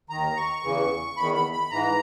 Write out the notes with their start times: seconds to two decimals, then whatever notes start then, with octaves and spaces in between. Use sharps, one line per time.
0.10 D#2 D#3 A#5
0.36 C#6
0.63 E2 C#3 E3
1.17 E2 D#3 B5
1.34 B5
1.53 B5
1.71 G#2 E3 A#5